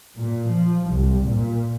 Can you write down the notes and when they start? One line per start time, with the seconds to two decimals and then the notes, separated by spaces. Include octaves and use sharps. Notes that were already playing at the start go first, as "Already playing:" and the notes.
0.16 A#2
0.48 F3
0.89 C2
1.24 A#2